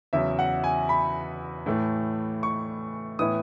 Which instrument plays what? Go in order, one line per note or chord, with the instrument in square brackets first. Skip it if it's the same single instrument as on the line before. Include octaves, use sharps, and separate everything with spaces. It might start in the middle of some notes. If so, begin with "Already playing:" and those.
[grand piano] E2 C#3 F#3 E5
F#5
G#5
B5
A2 E3 A3
C#6
A2 E3 B3 E4 D#6